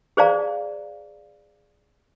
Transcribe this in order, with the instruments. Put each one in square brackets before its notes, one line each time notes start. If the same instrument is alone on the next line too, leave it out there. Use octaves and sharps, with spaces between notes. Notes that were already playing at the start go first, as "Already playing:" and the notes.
[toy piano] G#4 C5 D5 F5 A#5